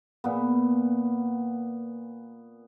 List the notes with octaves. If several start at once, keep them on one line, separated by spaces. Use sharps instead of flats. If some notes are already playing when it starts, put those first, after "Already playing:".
A#2 B3